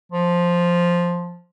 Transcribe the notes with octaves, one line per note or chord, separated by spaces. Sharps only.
F3